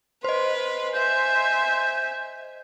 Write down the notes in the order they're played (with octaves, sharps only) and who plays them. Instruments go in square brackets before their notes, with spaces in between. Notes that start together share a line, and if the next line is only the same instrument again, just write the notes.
[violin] B4 [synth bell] C5 D#5 [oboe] C6
[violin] E5 G#5 [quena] G6